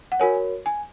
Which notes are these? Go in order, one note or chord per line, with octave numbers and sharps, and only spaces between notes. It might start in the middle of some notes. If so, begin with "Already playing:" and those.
F#5
F#4 A#4 C#5 G#5
G#5